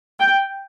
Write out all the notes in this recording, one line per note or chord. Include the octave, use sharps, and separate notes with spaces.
G5